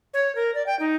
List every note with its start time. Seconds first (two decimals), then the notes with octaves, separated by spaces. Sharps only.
0.14 C#5
0.35 A#4
0.54 D5
0.66 G5
0.79 D#4